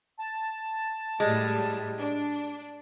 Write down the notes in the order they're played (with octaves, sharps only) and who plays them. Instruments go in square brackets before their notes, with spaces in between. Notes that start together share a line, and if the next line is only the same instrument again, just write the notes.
[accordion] A5
[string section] A2 G3 [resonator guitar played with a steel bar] G#3
[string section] D4